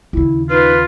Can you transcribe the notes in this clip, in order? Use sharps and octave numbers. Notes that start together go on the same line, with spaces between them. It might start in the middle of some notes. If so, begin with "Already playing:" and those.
D#2 C#3 E4
D#4 F4 B4